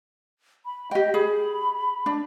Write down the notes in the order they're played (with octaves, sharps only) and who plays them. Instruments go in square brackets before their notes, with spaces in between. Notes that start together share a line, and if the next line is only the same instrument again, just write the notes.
[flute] B5
[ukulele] G4 G5 [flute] D#5
[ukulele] G#4 [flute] B5
[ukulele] D4